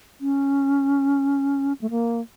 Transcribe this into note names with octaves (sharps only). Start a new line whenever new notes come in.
C#4
A3
A#3